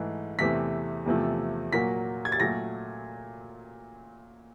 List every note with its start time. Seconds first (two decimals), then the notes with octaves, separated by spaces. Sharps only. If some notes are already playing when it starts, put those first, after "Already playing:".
Already playing: G#2 E3 A3
0.39 E2 C3 E3 A3 B6
1.06 E2 C3 F3 A3
1.73 A#2 F#3 A#3 B6
2.25 G#6
2.32 A6
2.40 A#2 F#3 A3 A#6